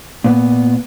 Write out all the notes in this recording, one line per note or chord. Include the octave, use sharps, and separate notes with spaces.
A#2 B3